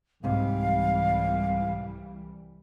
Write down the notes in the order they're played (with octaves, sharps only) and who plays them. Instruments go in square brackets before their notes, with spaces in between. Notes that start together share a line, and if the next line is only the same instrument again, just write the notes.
[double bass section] C2 E3 G3 [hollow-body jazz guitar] G#2 C3 [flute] F5